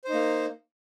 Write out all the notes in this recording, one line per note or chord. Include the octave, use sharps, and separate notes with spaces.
A#3 D#4 C5